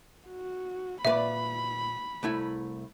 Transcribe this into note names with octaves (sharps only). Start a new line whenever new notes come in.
F#4
A#2 B4 D5 E5 B5
C2 A3 E4